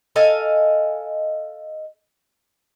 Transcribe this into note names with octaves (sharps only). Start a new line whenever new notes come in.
A4 D#5 F5 G#5